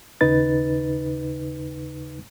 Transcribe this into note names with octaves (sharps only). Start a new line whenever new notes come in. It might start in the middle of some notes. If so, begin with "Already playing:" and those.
D#2 C#3 D#4 B4 A6